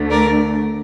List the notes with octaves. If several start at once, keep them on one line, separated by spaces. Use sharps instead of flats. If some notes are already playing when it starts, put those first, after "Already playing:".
Already playing: D2 D3 A3
A#4 D5